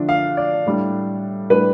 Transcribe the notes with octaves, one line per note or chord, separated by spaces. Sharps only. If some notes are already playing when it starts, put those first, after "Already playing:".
Already playing: D3 F3 A3 D4
F5
D5
A2 G3 D4
A2 G3 D4 B4